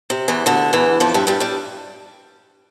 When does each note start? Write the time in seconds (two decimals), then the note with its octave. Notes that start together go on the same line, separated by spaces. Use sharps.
0.10 C3
0.28 E2 E3
0.46 D2 D3
0.73 E2 E3
1.00 F2 F3
1.14 G2 G3
1.27 G2 G3
1.40 G2 G3